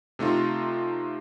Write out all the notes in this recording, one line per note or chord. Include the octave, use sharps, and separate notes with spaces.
C3 A3 D#4 F4